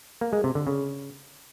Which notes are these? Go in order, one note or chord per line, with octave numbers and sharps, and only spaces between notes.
A#3
G#3
C3
D3
C#3